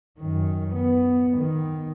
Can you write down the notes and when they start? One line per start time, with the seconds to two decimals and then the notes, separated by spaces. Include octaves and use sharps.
0.19 F#2 D#3
0.75 B3
1.37 D#3